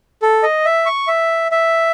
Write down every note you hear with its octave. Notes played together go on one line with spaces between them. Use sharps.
A4
D#5
E5
C#6
E5
E5